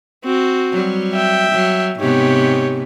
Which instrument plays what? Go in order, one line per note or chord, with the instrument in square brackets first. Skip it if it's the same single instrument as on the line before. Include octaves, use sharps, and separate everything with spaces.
[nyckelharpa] C4 F#4
[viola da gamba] F#3 G3
[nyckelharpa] E5 G5
[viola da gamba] F#3
[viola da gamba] G#2 C3 B3 [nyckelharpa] G4 C#5